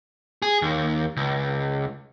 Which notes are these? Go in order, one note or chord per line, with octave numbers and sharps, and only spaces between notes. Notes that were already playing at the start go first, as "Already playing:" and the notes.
G#4
D#2
C#2